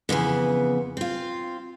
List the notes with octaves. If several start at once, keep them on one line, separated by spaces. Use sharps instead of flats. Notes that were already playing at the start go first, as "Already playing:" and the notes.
F2 C#3 E3 B3
C4 F4